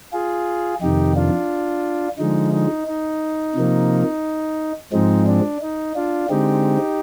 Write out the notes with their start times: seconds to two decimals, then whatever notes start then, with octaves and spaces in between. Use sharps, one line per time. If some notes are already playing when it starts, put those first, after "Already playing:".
0.13 F4 G#4
0.82 F2 C3 D#3 D#4 G4
1.16 D4 F4
2.18 D3 F3 G#3 D#4
2.53 D#4
2.87 D#4
3.55 C3 F3 A#3
4.92 G#2 F3 G#3 C4 D#4
5.27 D4
5.62 D#4
5.95 D4 F4
6.30 D3 G#3 C4 D#4 G4